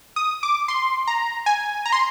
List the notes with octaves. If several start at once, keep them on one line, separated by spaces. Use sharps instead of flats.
D#6
D6
C6
A#5
G#5
A#5
C6